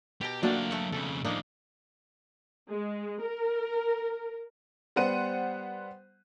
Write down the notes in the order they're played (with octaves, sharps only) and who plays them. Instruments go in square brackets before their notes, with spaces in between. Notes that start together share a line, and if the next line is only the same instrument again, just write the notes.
[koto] B2 A#5 [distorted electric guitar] G4
[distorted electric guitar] F#3 F5 [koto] A3 D4 G5 [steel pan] A#3 F#4 D5
[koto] A3 F#5
[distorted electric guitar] F2 C#3 [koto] A4
[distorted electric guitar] A2 F3 [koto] A#3 D4 D#4
[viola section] G#3
A#4
[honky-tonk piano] G3 B3 C5 F#5 D#7